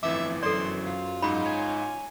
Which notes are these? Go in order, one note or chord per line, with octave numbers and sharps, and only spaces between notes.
G1 F2 E3 A3 E5 D6
F#2 F#3 A4 C5 D5 C6
F4
G#2 D#4 B5
C#5 G#5